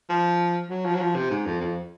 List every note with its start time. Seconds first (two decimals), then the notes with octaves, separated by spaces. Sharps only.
0.09 F3
0.70 F#3
0.85 F3
0.95 F#3
1.00 F3
1.16 C3
1.31 G#2
1.46 F2
1.61 F2